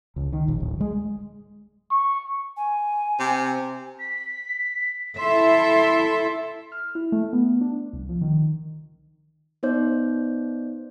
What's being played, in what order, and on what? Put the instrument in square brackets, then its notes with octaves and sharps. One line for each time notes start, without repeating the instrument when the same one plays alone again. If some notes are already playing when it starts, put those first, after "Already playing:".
[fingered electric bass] C#2
D#3
A#1
D1
G#3
[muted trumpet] C#6
[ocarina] G#5
[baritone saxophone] C3 [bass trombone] C4
[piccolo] B6
[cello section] E4 A4 E5 [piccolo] C6
[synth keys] F6
E4
A3
B3
D4
C2
F3
D#3
[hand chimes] B3 D#4 C5 D5 G6